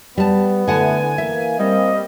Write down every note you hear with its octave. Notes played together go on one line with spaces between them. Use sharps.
G3 B3 A5
D3 A3 E4 F#5 G#5 A5
E3 A#3 E5
G3 A#3 C4 D#5